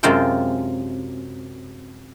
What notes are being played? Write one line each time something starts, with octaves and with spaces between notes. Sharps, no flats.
F#2 C3 G#3 F4 G5 A5